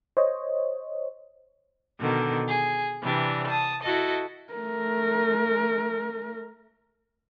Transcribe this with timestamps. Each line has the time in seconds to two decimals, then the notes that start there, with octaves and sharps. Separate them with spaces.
0.17 C5 C#5 D#5
2.00 B2 D3 D#3
2.50 G#4
3.03 C3 E3 G3 D4
3.47 A5 D#6
3.83 E4 F#4 A4 D#5
4.54 A3 A#4